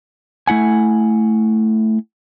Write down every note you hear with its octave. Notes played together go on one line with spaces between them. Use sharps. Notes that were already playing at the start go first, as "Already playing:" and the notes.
A3 E4 F#5 G#5